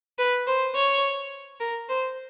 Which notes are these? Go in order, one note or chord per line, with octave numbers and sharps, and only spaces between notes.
B4
C5
C#5
A#4
C5